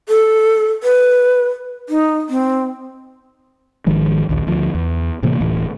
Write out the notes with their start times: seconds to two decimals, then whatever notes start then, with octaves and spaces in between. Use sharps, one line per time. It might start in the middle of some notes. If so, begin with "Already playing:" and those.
0.09 A4
0.83 B4
1.89 D#4
2.29 C4
3.86 G#1 D#3 F3 G#3
4.29 A#1 D#2
4.47 D2 F3
4.75 E2
5.23 A2 C3 E3 A#3
5.41 D1 A2 E3